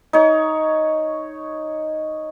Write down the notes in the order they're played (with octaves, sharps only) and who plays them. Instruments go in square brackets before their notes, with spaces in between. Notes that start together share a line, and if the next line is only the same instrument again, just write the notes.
[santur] D#4 C#5